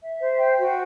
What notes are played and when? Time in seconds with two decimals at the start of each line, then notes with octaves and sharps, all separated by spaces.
0.01 E5
0.20 C5
0.38 G5
0.56 F#4